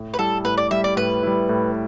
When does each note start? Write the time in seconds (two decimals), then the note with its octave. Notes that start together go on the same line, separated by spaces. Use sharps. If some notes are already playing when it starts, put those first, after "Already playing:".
Already playing: A2
0.14 B4
0.19 G3 E4 A4
0.45 A2 B4
0.58 D5
0.71 G3 E4 E5
0.84 D5
0.97 A2 B4
1.23 G3 E4
1.49 A2